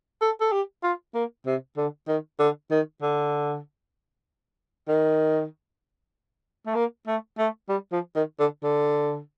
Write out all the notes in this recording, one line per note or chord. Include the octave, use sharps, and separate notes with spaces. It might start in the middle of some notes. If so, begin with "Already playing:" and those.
A4
A4
G4
F4
A#3
C3
D3
D#3
D3
D#3
D3
D#3
A3
A#3
A3
A3
G3
F3
D#3
D3
D3